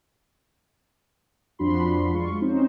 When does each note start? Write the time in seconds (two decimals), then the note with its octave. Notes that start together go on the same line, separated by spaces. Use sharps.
1.59 F2 F3 D4 F#4 B5 C6
2.13 G#3 F4 C6 C#6
2.40 C4 C#4 D#4 C5